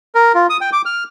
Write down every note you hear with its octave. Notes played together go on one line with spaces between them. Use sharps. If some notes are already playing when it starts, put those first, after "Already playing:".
A#4
F4
D#6
G5
D6
F6